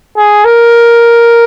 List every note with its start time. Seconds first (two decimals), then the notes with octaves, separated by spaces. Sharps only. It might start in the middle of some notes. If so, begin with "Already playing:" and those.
0.16 G#4
0.45 A#4